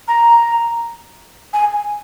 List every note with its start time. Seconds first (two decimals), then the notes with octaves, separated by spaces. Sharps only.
0.08 A#5
1.53 G#5